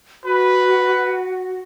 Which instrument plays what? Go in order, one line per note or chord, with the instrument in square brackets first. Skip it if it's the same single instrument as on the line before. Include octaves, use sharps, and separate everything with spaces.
[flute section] F#4 [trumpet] B4